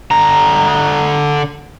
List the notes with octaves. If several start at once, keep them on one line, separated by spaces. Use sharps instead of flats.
D3 A#5